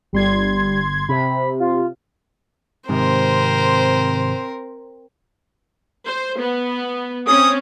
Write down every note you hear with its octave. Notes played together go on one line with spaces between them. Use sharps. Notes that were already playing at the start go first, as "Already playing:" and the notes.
G1 G3 C6 G#6
C3 B5
F4
G#2 C3 D#3 C4 A#4 C5
C5
B3
C4 C#4 D#6